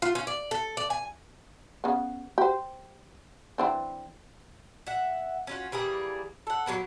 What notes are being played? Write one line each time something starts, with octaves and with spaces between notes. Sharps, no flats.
F4
C#4
D5
A4
D5
G#5
C#3 B3
G4 C5
E3 C4 D4
E5 F#5
C#4 F4 F#4
E3 G3 A#3 G#4
A4 F#5
F#3 G#3 A#3 B3